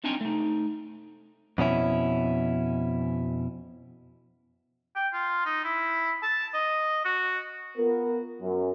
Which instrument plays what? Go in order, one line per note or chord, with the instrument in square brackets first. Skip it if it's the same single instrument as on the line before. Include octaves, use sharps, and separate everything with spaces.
[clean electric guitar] C4 D4 D#4 F4 G5 G#5
A3 D#4
F2 B2 C#4 E4
[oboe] G5
F4
D#4
E4
A5
D#5
F#4
[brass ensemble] B3 F4 A#4
F#2